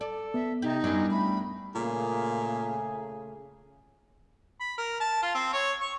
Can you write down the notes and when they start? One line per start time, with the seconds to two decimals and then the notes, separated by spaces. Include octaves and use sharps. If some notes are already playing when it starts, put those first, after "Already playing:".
0.01 A4 D5
0.34 B3 E5
0.62 C3 D#4 G4
0.84 F#2 G3 D4 E4
1.11 A3 B5
1.75 A#2 C#3 A3 G#4
4.61 B5
4.78 A#4
5.00 A5
5.22 F4
5.35 C4
5.53 C#5
5.81 C#6